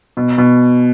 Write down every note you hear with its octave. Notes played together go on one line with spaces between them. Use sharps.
B2
B2